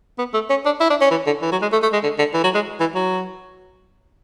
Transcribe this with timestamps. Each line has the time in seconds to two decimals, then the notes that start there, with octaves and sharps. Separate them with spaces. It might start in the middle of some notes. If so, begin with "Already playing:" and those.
0.18 B3
0.34 A3
0.50 C#4
0.65 D4
0.80 E4
0.90 D4
1.01 C#4
1.11 E3
1.26 D3
1.42 E3
1.52 F#3
1.62 G#3
1.72 A3
1.82 A3
1.93 G#3
2.03 D3
2.18 D3
2.34 E3
2.44 F#3
2.54 G#3
2.80 E3
2.95 F#3